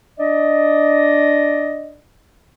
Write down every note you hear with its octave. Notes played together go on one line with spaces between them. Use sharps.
D4 D5 D#5